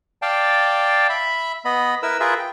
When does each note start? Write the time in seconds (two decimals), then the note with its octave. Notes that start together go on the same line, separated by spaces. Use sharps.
0.22 D5 F5 G5 A5
1.09 E5 B5
1.65 B3 D#5 B5
2.03 E4 A#4 B4 E6
2.20 F4 G#4 A#4 B4 E5
2.39 G5